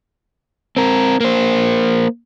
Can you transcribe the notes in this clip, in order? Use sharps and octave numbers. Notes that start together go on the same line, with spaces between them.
C4 A#4
A#3 C5